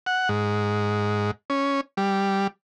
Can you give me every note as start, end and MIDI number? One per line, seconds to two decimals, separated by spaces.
0.06 0.29 78
0.29 1.31 44
1.50 1.81 61
1.97 2.47 55